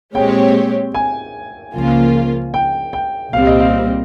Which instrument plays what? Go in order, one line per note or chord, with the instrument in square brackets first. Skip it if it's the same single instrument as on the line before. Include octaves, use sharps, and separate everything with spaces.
[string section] A#2 G#3 C4 G4 C#5 [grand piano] G5
[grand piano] G#5
[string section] C#2 C#3 F3 A#3 F4
[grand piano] G5
G5
[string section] C2 A#2 G3 C4 [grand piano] F5
[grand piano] D#5
F5